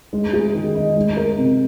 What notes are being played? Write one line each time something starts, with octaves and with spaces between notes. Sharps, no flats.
G#3
G#4
D#3
D#4
G#3
A#4
C3